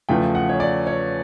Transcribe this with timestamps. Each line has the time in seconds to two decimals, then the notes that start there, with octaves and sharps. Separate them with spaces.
0.09 E2 C#3 F3 A3 G5
0.35 F#5
0.49 C#5
0.60 D5
0.87 C#5